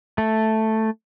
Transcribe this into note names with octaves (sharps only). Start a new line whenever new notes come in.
A3